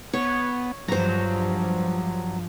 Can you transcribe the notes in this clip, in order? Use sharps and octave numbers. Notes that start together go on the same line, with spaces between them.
B3 C#5
G2 F3 F#3 C5 A#5